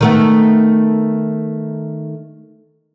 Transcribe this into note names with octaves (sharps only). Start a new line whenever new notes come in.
D#3 A3 B3